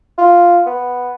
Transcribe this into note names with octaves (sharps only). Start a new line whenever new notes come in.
F4
B3